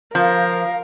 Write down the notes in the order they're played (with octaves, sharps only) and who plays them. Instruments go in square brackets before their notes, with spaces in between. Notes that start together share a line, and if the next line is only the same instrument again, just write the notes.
[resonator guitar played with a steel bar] F3 [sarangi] A#4 [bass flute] F5